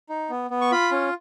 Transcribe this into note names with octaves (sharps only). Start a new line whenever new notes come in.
D#4
B3
B3
C#6
F4 B5
C#4